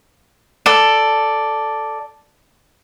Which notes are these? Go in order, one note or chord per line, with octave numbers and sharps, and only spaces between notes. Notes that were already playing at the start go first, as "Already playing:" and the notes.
A4 D5